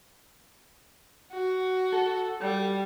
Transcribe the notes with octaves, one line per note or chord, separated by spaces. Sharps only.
F#4
A4
G3